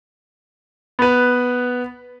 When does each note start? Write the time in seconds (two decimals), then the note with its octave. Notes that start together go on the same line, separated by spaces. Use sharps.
0.99 B3 B4